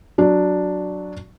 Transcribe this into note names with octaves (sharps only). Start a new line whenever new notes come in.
F#3 D4